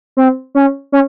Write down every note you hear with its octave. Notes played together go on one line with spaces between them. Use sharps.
C4
C#4
C#4